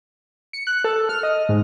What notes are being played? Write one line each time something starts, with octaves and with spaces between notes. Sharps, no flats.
C#7
F#6
A4
F6
D#5
G#2